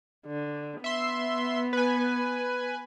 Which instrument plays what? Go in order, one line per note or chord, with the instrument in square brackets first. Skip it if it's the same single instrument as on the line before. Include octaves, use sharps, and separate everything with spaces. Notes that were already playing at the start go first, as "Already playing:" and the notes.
[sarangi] D3
[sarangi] B3 [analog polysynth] E5 C6
[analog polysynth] B4 G#5